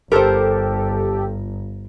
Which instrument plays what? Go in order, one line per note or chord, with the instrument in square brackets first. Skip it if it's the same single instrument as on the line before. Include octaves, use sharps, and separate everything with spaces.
[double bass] G1 [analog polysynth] G4 A4 [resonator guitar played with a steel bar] A#4 C5